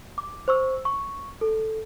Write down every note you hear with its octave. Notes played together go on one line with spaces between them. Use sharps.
D6
C5 C#6 E6
C#6
A4